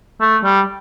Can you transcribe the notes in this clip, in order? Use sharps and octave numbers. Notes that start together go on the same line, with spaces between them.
A3
G3